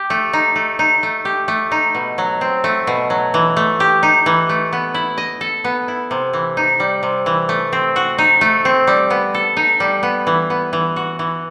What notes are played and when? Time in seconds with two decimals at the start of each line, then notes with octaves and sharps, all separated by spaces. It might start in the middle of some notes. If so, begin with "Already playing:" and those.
Already playing: G4
0.10 A3
0.33 D#4
0.56 A3
0.79 D#4
1.03 A3
1.25 G4
1.48 A3
1.72 D#4
1.95 B2
2.18 F#3
2.41 C4
2.64 A3
2.87 B2
3.10 F#3
3.34 E3
3.57 A3
3.80 G4
4.03 D#4
4.26 E3
4.49 A3
4.73 B3
4.94 E4
5.18 D#5
5.41 A4
5.64 B3
5.88 E4
6.11 C3
6.33 E3
6.57 D#4
6.80 G3
7.03 C3
7.26 E3
7.49 A3
7.73 C4
7.96 F#4
8.18 D#4
8.41 A3
8.65 C4
8.87 G3
9.10 B3
9.34 A4
9.57 D#4
9.80 G3
10.03 B3
10.27 E3
10.50 B3
10.73 E3
10.96 F#4
11.19 E3